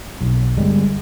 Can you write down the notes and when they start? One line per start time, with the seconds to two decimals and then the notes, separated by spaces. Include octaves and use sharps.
0.21 B1
0.57 G1 G3 G#3